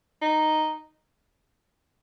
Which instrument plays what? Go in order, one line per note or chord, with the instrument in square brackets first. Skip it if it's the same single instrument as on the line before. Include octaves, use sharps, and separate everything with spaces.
[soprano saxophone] D#4